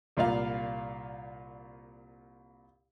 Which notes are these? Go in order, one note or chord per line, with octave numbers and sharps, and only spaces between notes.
C2 A#2 D5 F5